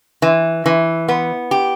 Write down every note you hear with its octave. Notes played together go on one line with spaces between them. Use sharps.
E3
E3
B3
G4